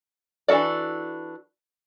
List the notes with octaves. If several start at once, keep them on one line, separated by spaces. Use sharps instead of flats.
E3 D4 F#4 A4 D5